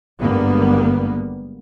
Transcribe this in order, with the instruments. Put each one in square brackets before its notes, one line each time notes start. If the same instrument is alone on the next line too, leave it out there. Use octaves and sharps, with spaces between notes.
[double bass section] G#1 G2 D3 G3 A#3 B3